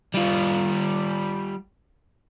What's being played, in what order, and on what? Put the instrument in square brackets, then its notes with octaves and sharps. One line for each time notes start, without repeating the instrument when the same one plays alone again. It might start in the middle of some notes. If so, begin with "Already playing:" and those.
[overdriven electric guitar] G3 F4